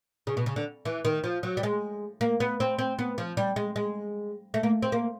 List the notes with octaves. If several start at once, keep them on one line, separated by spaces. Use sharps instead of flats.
C#3
B2
C#3
D3
E3
D#3
F3
F#3
G3
G#3
A#3
B3
C4
C4
B3
F3
G3
G#3
G#3
A3
A#3
C4
A#3